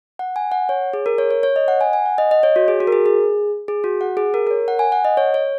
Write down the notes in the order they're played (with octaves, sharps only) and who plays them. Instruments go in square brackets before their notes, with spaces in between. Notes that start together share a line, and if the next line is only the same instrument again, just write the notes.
[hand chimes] F#5
G#5
F#5
C#5
G#4
A#4
C#5
C#5
C#5
D#5
F#5
G#5
G#5
F#5
D#5
D#5
C#5
F#4
G#4
F#4
A#4
G#4
G#4
G#4
F#4
F#5
G#4
A#4
A#4
C#5
F#5
G#5
F#5
D#5
C#5
C#5